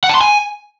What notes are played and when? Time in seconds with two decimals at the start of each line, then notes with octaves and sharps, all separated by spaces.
0.04 F#5
0.09 A5
0.15 C6
0.21 G#5